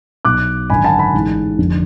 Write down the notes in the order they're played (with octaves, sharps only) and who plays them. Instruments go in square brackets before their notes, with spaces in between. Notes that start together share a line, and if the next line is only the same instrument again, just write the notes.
[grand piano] B1 B2 D6 F#6
G#1 F#2 D3 G#5 B5
F#5 A5
G#5 B5
A1 G#2
F1 F2 D3